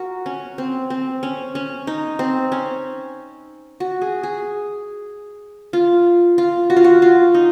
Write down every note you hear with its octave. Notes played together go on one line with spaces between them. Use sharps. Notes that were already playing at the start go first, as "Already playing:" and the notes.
Already playing: F#4 A#4
C#4
C4
C4
C#4
C#4
D#4
C4
C#4
F#4
G#4
G#4
F4
F4
F#4
F4
F#4
F4
D#4